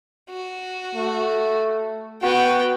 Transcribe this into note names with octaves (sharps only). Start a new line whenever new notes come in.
F#4
A3
B3 F#4 G5